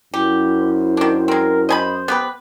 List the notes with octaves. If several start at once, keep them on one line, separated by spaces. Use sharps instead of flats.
F#2 E4 G4
C5
D#3 D4
G#3 C4 A#4
C5 D#5 G#5 B5
B3 G4 B4